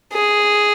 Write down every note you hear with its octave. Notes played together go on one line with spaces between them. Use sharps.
G#4